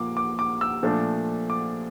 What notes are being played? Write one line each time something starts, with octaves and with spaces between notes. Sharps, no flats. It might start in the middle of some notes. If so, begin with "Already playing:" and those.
Already playing: A#2 F3 A#3 D6
D6
D6
E6
A#2 F3 A3 D4
D6